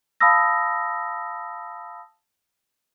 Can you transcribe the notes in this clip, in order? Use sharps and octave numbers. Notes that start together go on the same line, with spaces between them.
F5 A5 B5 D#6 E6 A#6